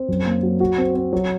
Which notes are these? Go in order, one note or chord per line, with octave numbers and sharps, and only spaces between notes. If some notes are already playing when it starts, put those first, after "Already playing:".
Already playing: C4
F#2
A#3
F#3
F#4
C4
C4
F#3